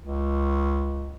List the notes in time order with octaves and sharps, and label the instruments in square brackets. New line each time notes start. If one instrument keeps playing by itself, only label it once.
[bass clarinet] C#2